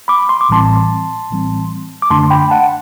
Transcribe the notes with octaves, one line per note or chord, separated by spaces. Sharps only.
B5 D6
C6
D6
A1 A2 E3 G3 C4 A5 C6
A1 A2 E3 G3 C4
D6
F#2 D3 A3 D4 A5 C6
G5 B5
F#5 A5